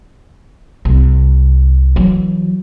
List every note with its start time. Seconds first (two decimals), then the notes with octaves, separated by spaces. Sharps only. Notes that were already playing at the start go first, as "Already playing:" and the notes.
0.85 C2
1.96 E3 F#3